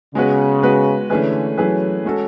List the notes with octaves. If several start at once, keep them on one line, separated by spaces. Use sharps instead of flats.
C#3 G#3 B3 F#4 B4
G#3 B3 F#4 B4
D3 E3 A3 C#4 G#4 B4
E3 F#3 A3 C#4 G#4 B4
G#3 C#4 F#4 A4